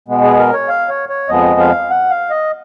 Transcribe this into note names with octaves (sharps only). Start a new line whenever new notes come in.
B2 G#3 B3
G#4
A#4
C#5
F5
C#5
C#5
F2 F3 G#3 B3 D#5
F5
F#5
F5
D#5